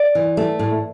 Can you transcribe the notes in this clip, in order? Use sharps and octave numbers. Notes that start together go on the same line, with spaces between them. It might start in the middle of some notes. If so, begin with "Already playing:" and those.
Already playing: D5
E3
A3
A2